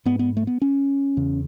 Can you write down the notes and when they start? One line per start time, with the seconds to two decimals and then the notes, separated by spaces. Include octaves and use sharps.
0.06 G#2 B3
0.19 B3
0.37 A3
0.47 B3
0.62 C#4
1.17 E2 C#3